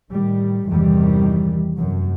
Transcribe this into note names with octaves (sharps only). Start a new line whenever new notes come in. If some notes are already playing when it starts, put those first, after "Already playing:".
A2 D#3 G3
E2 G2 C3 D#3 E3 G3
F1 F#2